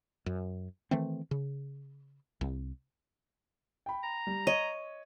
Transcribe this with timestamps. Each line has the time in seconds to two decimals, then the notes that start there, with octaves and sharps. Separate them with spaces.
0.26 F#2
0.91 D#3 E3 A3 C4
1.31 C#3
2.41 C2
3.86 G5 B5
4.03 A#5
4.27 G3
4.47 C#5 D#5